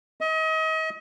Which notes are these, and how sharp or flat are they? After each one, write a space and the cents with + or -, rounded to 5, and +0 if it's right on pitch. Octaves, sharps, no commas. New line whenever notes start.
D#5 +35